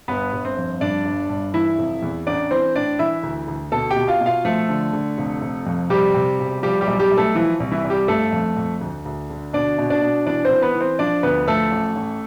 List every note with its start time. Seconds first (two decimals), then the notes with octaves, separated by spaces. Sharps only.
0.08 G1 B3 B4
0.33 G1
0.45 C4 C5
0.57 F2
0.81 G2 D4 D5
1.05 G1
1.29 G2
1.54 E3 E4 E5
1.78 F1
2.02 E2
2.26 A1 D4 D5
2.51 E3 C4 C5
2.75 A2 D4 D5
2.99 E3 E4 E5
3.23 D2
3.48 D2
3.72 B2 A4 A5
3.90 G4 G5
3.96 B2
4.08 F4 F5
4.21 B2
4.26 F4 F5
4.45 F3 A3 A4
4.69 D3
4.93 D3
5.18 F1
5.42 F1
5.66 F2
5.90 C3 G3 G4
6.14 C3
6.39 E1
6.63 F3 G3 G4
6.81 G3 G4
6.87 B1
6.99 G3 G4
7.11 B1
7.17 A3 A4
7.35 E3 F3 E4
7.60 C2
7.71 E3 E4
7.84 C2
7.90 G3 G4
8.08 G1 A3 A4
8.32 F2
8.57 F2
8.81 D2
9.05 D2
9.30 D3
9.53 B2 D4 D5
9.78 B2
9.90 D4 D5
10.02 B2
10.26 E3 D4 D5
10.45 C4 C5
10.51 E3
10.62 B3 B4
10.75 E3
10.81 C4 C5
10.99 F3 D4 D5
11.23 D2 B3 B4
11.47 F3 A3 A4
11.72 A1
11.96 A1